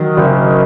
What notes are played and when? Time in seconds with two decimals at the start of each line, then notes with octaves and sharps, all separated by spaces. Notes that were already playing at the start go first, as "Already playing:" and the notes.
Already playing: D#3 F#3
0.17 F#1